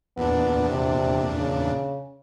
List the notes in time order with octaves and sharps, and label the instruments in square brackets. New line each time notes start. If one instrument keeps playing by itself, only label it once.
[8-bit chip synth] E2 A#2 D4 [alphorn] B3
[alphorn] C3
C#3